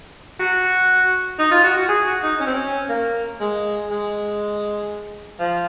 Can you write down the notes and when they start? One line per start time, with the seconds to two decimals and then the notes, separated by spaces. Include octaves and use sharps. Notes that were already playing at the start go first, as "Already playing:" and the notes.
0.39 F#4
1.39 D#4
1.51 F4
1.64 F#4
1.76 F#4
1.89 G#4
2.06 F#4
2.23 D#4
2.40 C#4
2.47 C4
2.55 C#4
2.89 A#3
3.40 G#3
3.90 G#3
5.39 F3